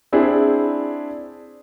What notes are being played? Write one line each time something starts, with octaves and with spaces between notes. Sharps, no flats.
C4 D4 E4 G#4